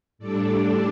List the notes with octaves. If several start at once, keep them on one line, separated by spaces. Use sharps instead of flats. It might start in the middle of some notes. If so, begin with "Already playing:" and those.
A2 G3 D4 A4 D5